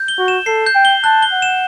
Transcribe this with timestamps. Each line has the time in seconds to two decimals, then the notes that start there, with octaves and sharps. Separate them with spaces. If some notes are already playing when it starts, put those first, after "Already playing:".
Already playing: G6
0.08 G7
0.18 F#4
0.28 E7
0.46 A4 C7
0.66 G6
0.75 G5
0.85 G7
1.04 A5 F#6
1.22 G7
1.32 F#5
1.42 E7